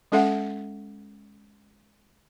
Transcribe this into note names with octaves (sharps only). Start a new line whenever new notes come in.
G#3 C#4 A4 E5 F#5